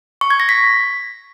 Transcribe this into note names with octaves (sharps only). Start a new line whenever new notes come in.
C#6
G#6
A#6
B6